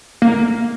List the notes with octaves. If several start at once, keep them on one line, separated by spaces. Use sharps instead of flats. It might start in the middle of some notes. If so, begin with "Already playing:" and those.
A#3